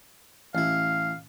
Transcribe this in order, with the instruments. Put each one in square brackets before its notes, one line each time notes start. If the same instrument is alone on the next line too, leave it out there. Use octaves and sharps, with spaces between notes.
[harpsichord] A1 E4 [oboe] F5